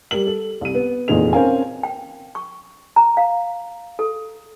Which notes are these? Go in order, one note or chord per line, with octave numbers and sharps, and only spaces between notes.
G3 A#4 F#7
A4
C2 D#7
B3
F1 E2 A#2 D#4 G#4 F7
C4 C#4 A#4 F5 G#5
G5
C#6
A#5
F5
A4